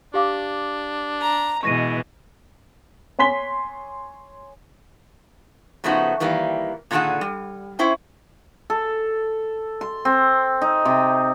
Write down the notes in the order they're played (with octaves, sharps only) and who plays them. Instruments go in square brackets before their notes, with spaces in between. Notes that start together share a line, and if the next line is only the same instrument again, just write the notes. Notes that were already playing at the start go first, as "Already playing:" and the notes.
[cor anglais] D4 [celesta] G4 F5 D6
[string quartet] A#5
[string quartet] B2 E3 G#3 [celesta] C#6 A#6 D#7
[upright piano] C#5 G#5 C6 B6 G7
[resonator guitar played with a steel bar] C#3 F3 A3 B3 D#4 F#4
D#3 E3 G3 A#3
A#2 D3 D#3 G#4 A4 F#5
G3
C#4 E4 C5 G5
[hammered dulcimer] A4
C6
C4
D#4
C3